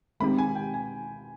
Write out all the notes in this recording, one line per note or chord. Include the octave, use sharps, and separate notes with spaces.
D#3 G#3 C4 D#4 G4 B5
G#5
G5
G#5